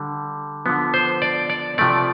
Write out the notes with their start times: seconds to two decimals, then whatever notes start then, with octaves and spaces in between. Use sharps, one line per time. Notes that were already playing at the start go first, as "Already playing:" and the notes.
Already playing: D3 G3
0.66 D3 F3 B3
0.94 C5
1.22 D5
1.50 D5
1.78 C3 F3 A3 D5